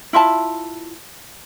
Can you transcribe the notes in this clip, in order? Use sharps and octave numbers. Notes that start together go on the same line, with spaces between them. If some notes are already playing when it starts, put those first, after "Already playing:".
E4 F4 E5 A5